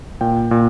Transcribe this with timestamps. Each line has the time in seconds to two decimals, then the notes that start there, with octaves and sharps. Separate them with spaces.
0.21 A#2 G5
0.51 A#2